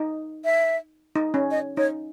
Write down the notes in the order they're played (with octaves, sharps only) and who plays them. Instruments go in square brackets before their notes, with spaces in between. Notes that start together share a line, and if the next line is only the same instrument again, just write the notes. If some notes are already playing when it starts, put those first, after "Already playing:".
Already playing: [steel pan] D#4
[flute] E5
[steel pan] D#4
C#4
[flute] D#5
[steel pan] D#4 [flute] C#5